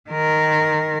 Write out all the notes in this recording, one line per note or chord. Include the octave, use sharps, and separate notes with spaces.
D#3 A#4